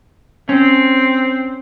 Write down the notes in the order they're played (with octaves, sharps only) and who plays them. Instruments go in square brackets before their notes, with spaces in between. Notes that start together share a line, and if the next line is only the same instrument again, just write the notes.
[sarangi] C4 [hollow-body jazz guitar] C#4